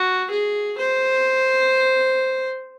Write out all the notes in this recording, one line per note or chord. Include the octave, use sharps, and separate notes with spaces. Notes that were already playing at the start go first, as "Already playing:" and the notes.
Already playing: F#4
G#4
C5